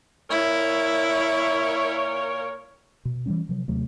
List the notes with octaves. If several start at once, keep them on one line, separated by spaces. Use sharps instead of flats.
A#2 E4 A#4 C#5
B2
E3 F#3 G3 C#4
C3 F3 F#3
D#2 C3 F#3 A3